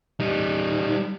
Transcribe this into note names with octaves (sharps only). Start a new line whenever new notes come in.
G3 D#4